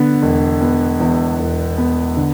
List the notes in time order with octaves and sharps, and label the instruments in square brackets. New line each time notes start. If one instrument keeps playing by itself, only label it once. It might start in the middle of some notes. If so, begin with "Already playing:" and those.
Already playing: [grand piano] D3 B3
E1
B3
E2
E1
B3
D3